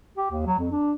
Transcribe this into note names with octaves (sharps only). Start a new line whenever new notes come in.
G4
D#2
F#3
F2
D4